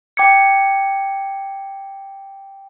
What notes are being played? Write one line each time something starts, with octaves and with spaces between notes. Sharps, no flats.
G5 D6 G#6 C#7